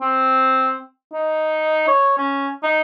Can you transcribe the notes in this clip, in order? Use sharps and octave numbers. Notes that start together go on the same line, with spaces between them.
C4
D#4
C#5
C#4
D#4